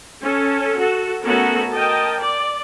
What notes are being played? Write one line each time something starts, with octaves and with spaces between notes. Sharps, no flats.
C#4 A4
F#4 A4
A3 B3 C#4 F#4 A4 A#4
A#4 D#5 G5 A5
D5